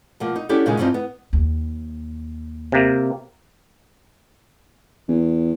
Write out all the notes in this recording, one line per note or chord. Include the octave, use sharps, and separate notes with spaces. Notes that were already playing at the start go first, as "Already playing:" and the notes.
B2 F3 A#3
D#4
C#4 D4 E4 F#4 G4 A4
A#2 C#3 G#3 D#4
G2 E3 F3 A#3 C4 D#4
B3
D#2
C3 A#3
E2